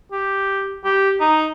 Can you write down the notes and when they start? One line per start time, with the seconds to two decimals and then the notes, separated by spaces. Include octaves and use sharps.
0.12 G4
0.85 G4
1.20 D#4